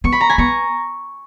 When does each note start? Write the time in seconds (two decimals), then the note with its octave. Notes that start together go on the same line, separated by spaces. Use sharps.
0.04 B3 C#6
0.12 B5
0.21 A#5
0.29 G#5 B5
0.38 B3 A#5 C#6